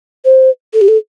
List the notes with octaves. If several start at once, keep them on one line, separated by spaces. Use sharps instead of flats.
C5
A4
G4
A4